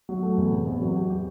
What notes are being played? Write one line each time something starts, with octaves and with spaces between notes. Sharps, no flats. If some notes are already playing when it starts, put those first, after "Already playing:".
F#3
A3
E2
C3
E2
F#3
G4
G4